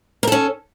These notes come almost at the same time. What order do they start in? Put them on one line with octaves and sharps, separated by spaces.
A#4 A4 C#4